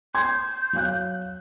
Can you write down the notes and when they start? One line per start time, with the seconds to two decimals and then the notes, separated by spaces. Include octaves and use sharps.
0.15 C6 G6 G#6
0.73 F#3 F5 F#6